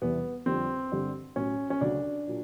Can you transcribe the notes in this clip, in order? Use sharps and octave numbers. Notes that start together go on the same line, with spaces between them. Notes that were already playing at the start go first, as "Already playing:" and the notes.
E2 C3 E3 G3 B3
F2 D3 G3 C4
G2 D3 G3
A2 F#3 C#4
C#4
D2 C#3 F#3 D4
A#2 F#3